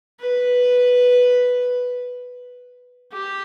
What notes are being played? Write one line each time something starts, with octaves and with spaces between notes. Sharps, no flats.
B4
G4